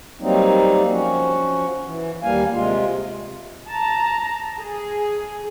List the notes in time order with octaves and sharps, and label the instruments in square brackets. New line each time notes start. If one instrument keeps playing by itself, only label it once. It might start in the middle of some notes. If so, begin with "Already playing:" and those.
[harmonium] F#3 G3 A#3 C4 D#4
F3 C#4 F#4
E3
D#2 G3 A#3 F5 G#5
C3 G#3 F4
[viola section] A5 A#5
G#4